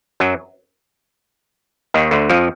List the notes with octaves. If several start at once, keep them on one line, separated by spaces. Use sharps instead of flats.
F#2 F#3
D#2 D#3
D2 D3
F2 F3